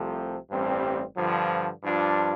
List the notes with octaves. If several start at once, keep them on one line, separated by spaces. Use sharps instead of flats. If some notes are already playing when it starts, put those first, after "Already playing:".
Already playing: C2 C3 F3 A3
A1 G2 G3 C4
G2 D3 F3
G2 F3 D4 F4